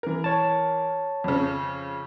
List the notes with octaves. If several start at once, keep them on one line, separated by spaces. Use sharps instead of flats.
E3 A#4
C#5 A5
F2 C#3